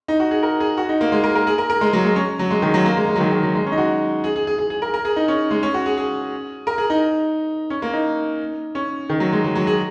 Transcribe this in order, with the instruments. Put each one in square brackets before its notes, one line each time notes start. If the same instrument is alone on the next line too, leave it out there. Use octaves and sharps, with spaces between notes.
[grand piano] D#4
F#4
G#4
A#4
G#4
F#4
D#4
A#3
G#3
A#4
A#4
G#4
A#4
A#4
G#3
F#3
G#3
C#4
F#3
G#3
D#3
F#3
A#3
G#3
G#3
F#3
D#3
D#3
F#3
G#3
C#4
D#4
F#4
G#4
G#4
G#4
G#4
G#4
A#4
A#4
G#4
D#4
C#4
G#3
C#4
F#4
G#4
G#4
A#4
G#4
D#4
C#4
A#3
D#4
C#4
D#3
F#3
G#3
F#3
F#3
G#4